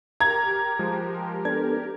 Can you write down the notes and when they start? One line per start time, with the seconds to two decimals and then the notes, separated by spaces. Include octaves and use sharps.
0.20 G4 A#4 A#5 G#6
0.79 F3 G#3
1.45 B3 D4 A4 G#6